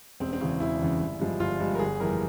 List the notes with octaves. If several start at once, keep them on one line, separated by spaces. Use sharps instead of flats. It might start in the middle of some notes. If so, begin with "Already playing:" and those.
E1 C4
C4
E2 C#3 E3 C#4
E1 E4
E2 C#3 E3
G1
G2 F3 G#3
G1 F4
G2 F3 G#3
A#4
G1 G#4
F2 E3 G3 A#4